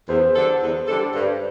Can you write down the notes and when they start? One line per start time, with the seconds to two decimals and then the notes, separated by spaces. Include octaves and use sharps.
0.09 E2 C5
0.36 D3 G3 D4 A4
0.62 E2
0.87 D3 G3 D4 A4
1.15 G2